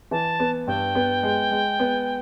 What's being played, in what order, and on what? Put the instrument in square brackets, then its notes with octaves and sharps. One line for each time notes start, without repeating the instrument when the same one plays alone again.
[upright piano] E3 [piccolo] A5
[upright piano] B3
[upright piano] G2 [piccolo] G5
[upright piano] B3
G#3
G#3
B3